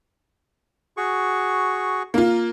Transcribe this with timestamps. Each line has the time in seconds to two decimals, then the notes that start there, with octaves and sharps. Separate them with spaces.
0.97 F#4 G#4 C#6
2.14 A#3 F4 A#4